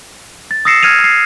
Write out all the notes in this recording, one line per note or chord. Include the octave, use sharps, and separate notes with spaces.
A6
D#6 E6 A#6 C7 C#7 E7
F6 G#6 D#7 F7
C7